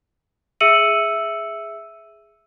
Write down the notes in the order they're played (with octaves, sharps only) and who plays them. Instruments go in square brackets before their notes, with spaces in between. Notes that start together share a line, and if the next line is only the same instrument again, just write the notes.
[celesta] G#4 E5 E6 C#7 D#7 F#7